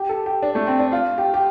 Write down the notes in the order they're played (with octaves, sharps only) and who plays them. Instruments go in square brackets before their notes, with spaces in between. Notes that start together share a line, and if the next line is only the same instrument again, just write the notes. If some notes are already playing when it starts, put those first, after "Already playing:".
Already playing: [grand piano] G4
A4
G4
D4
A3
C4
D4
F4
G4
G4